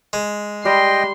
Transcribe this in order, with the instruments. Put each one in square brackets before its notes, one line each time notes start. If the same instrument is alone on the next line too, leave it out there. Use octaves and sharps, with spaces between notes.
[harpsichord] G#3
[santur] G3 [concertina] D#5 G5 [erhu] C6